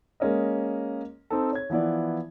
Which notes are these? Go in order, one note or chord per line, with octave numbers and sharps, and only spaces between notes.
G#3 A#3 C#4 A#4 D#5
C4 D#4 A4
C#5 G#6
E3 F3 B3 E4 D5